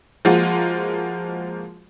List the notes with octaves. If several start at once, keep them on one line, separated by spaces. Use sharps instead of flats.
F3 G#3 A#3 F4 F#4